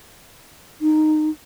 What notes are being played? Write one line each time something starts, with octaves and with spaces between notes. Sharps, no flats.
D#4